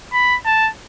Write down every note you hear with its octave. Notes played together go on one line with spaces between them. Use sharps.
B5
A5